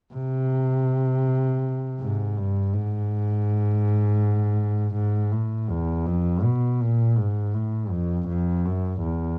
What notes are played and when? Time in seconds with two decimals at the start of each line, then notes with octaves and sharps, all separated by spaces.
0.14 C3
2.00 G#2
2.37 G2
2.73 G#2
4.95 G#2
5.32 A2
5.70 E2
6.06 F2
6.43 B2
6.81 A#2
7.18 G#2
7.54 A2
7.91 F2
8.29 F2
8.66 F#2
9.03 E2